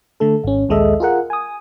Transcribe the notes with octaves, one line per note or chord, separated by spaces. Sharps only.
D3 A3 A4
G#1 C#4
A#1 D#2 G#3 A4 D#5 E5
F4 G#4 A#4 F#5
G#5 D#6